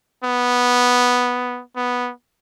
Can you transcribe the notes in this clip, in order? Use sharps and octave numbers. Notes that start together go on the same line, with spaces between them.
B3
B3